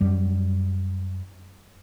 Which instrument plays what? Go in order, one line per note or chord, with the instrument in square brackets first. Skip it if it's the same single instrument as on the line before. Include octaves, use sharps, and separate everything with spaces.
[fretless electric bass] F#2 G3